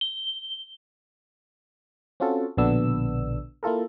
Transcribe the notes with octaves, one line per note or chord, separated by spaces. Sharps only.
G7
C4 C#4 F4 F#4 A4
A#1 B2 D3 B3 D4 E6
A#3 E4 F4 A4 A#4